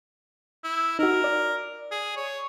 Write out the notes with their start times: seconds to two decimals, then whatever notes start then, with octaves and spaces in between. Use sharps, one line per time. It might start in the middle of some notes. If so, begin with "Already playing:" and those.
0.64 E4
0.99 D#4 F#4 A#4
1.24 D5
1.91 G#4
2.16 C#5